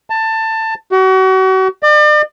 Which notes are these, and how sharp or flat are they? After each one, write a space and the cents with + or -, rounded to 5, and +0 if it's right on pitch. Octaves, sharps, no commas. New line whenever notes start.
A5 +20
F#4 +35
D5 +40